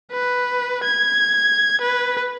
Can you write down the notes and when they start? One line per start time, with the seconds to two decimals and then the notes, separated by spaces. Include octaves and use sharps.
0.12 B4
0.84 G#6
1.81 B4